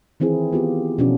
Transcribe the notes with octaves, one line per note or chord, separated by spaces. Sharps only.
D#3 E3 C4 E4 G#4
B3 F4 G4
B2 F3 C#4 D4 F#4